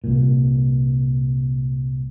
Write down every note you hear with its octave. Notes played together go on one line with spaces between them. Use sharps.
C2 A#2